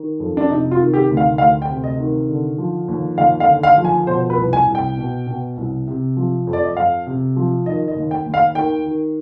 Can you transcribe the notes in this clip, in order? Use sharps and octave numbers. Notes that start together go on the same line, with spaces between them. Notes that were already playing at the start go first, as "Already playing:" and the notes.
Already playing: D#3
F2
D4
C3 D#4
F4
D#3
G4
D2
F5
D2 F5
G5
C3
D#5
D#3
D3
F3
D#2
D#2 F5
F5
D3
F5
F3
G#5
B2 C5
B4
C2
G#5
C2
G5
B2
B2
C2
C3
F3
F2
D5
D#5
F2 F5
C3
F3
D#3 D#5
D#5
D#2
G5
D#2
F5
D#3 G5
D#3